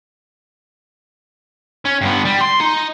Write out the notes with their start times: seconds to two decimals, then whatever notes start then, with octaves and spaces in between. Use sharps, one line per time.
1.85 C#4
2.01 G2 B3
2.25 G3
2.41 C6
2.61 D#4